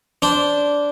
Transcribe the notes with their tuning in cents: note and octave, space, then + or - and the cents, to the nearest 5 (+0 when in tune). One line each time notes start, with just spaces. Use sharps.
D4 -15 C5 +0